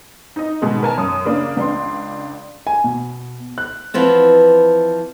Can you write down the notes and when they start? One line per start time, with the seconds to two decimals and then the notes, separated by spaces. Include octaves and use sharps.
0.36 D#4 D#5
0.62 G#2 B2 D#3 G#3
0.83 A#4 G#5 A5
0.97 F#2 D#6
1.25 C#3 A#3 D4
1.57 C#2 D4 C6
2.67 G#5
2.84 B2
3.58 F#6
3.94 E3 F3 B3 C4